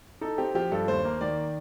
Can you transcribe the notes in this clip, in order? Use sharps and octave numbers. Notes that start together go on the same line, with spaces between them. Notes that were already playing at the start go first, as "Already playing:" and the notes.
D#4 A4
C4 G4
F3 G4
G2 A4
D#2 C5
A#3
D#3 D5